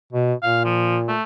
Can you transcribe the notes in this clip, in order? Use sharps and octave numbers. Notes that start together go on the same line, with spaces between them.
B2
A#2 F5
F3
A3